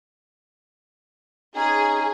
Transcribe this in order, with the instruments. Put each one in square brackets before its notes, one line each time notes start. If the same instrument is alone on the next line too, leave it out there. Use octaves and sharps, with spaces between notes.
[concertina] C#4 D#4 [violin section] G#4